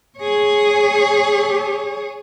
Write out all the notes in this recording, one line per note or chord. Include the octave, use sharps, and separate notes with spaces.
G#4 C#5